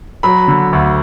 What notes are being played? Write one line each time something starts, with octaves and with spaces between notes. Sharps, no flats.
F#3 B5
D3
D2